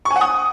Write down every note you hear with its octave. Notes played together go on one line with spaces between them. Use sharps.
C#6
G#5
F#5
D#6